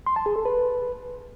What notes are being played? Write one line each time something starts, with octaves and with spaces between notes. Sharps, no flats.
C6
A5
G#4
A4
B4